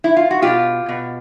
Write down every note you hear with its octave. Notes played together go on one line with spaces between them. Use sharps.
E4
F4
F#4
B2 F4 G4
B2